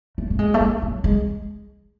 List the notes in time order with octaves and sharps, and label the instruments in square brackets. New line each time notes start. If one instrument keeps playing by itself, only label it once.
[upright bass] A3
A3
G#3
A3
G#3
F#3
G#3